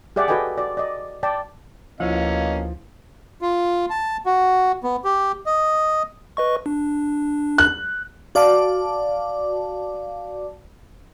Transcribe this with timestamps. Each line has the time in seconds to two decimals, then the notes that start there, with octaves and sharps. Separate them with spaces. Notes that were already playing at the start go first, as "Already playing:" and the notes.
0.16 G4 G#4 D5 E5 F#5 G5
0.28 F#4 A4 B4 D#5 G5 G#5
0.58 F#4 D5
0.77 D5 D#5
1.23 D5 G5 A5
2.00 D2 B2 F3 A#3 C#4 E4 D#5 F5
3.42 F4
3.90 A5
4.26 F#4
4.84 B3
5.05 G4
5.46 D#5
6.37 B4 D#5 C#6
6.66 D4
7.58 F#6
8.35 F#4 D5 F5 A5 D6